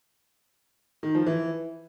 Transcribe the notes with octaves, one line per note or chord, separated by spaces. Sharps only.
D#3
F3
E3